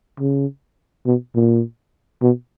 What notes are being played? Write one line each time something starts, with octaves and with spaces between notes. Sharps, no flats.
C#3
B2
A#2
B2